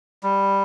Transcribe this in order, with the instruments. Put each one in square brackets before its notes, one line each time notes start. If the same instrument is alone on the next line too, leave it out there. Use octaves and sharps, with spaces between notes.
[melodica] G3